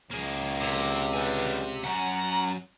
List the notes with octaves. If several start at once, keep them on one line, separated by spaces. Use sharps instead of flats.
C#2 A#3 G#4
C3
G3 B4 G#5
F#3 C#4 F#5 A#5